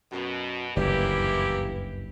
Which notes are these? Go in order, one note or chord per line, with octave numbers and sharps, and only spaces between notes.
F#2 B2
F#1 D2 G2 E3 A#3 E4 G4